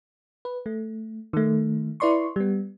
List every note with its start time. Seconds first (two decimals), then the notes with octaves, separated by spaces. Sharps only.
0.45 B4
0.66 A3
1.33 D#3 A3
2.00 E4 B4 D5 C6 C#6
2.36 G3 B3